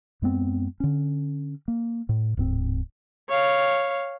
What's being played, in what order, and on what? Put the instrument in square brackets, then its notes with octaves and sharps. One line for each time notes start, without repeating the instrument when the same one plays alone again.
[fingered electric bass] F#2 G#3 B3 C4
D3 C#4
A#3
A2
D1 G#2 C4
[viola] C#5 F5